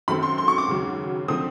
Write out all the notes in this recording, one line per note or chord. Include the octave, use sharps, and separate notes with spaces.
F#2 D#3 F#3 A3 C4 B5
C6
C6
C#6
D6
D#2 C#3 F#3
D3 F3 A3 C4 D#6